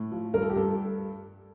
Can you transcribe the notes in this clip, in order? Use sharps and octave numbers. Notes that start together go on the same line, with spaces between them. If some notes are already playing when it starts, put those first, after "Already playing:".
Already playing: A2
F3
G2 A#4
A4
G4
G2 A4